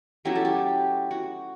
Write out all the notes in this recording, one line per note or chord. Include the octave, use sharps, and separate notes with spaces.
F#3 A3 C#4 E4 G4
A4
G4
F#4